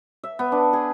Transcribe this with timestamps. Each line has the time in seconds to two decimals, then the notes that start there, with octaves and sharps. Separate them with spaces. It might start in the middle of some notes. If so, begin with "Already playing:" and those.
0.24 E5
0.39 B3
0.52 D4
0.73 G#4